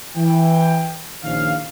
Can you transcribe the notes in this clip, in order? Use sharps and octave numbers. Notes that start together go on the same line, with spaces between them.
E3 G5
A#1 D#3 F3 C#4 F5